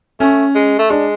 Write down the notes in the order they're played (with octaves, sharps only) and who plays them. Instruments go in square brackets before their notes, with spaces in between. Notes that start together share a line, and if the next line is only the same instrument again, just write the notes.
[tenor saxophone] A3 [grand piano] C#4
[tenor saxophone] G#3
A3
[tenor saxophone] G#3 [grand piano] D4